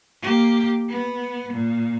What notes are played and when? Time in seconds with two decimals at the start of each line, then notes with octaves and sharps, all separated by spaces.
0.22 A#3 G4
0.89 B3
1.53 A#2